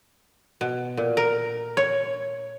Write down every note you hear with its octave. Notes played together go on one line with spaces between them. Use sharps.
B2
A#2
A#4
C#5